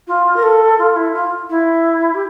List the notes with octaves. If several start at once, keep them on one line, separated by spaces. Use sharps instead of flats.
F4
A#4
A4
F4
E4
F4
E4
G4